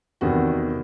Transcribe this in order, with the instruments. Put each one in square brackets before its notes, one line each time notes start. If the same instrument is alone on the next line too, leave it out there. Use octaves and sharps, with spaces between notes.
[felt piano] E2 C3 D#3 F#4